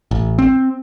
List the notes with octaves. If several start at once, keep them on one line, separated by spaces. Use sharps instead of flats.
A1
C4